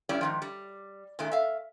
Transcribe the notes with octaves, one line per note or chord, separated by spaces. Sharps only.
G2 G3 C#4 E4 D5
G#2 D#3 F3
G3
A#2 D#3 G#3 A3
E5 F5